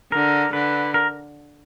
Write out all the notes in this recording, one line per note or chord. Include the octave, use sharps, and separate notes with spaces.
D3 A#4
D3 B4
A#4